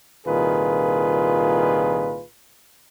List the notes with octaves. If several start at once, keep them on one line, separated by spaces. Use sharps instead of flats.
C2 A#2 D#3 F4 G#4 B4